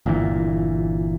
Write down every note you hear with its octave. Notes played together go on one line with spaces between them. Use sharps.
G1 A#2 E3